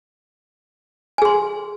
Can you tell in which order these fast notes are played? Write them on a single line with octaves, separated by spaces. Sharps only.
G#5 G#4 C6